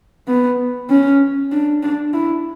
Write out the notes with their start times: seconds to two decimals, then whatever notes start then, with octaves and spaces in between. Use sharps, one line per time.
0.28 B3
0.90 C#4
1.52 D4
1.83 D4
2.13 E4